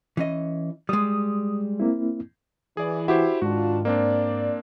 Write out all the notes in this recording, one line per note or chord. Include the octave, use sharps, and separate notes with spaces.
E3 C#4 D#5
G3 G#3 D#6
A#3 C4 E4
E3 G#4 D5
E4 F#4 G4 C5
G#2 D#3 D4 F4 F#4
A#3 C4 D4 D5